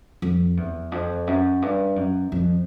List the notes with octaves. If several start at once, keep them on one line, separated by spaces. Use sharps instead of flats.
F2
E2
F2
F#2
G2
F#2
F2